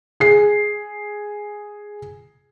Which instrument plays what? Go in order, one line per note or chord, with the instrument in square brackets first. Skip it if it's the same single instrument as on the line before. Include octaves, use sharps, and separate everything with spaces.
[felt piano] G#4 C7